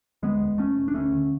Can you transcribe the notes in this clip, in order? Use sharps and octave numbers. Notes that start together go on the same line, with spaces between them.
D2 G#3 B3
E1
E1 A3 C#4
E1
D4
D2 A3 C#4
D3